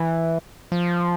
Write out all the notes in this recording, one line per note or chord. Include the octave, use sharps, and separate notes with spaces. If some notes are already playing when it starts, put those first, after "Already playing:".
Already playing: E3
F3